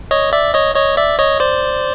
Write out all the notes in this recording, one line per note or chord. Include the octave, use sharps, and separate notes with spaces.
C#5 D#5
D5 E5
C#5 D#5
C#5 D#5
D5 E5
C#5 D#5
C5 D5